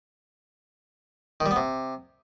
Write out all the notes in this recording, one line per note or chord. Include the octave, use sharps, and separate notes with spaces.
D#3
G3
B3
C3